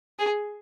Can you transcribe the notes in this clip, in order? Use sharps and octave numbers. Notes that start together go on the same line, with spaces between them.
G#4